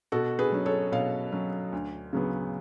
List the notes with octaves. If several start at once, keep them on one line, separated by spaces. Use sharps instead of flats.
B2 F#4 A4
G#4 B4
F#3 C#4
A4 C#5
B2 C#5 F5
F#3 C#4
D2
C#3 F#3 B3